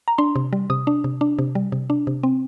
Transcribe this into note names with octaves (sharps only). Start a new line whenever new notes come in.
A#5
D4 C6
C3
G3
C3 D#6
D4
C3
D4
C3
G3
C3
D4
C3
C4